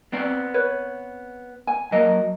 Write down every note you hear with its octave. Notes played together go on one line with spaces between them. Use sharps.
B3 C4 D5
B4 C#5
G#5
F#3 A#3 A#4 D#5